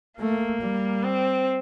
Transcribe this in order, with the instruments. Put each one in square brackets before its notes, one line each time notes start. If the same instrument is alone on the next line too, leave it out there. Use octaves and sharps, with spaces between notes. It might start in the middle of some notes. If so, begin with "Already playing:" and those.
[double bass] A3 [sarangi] A#3
[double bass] G3
[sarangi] C4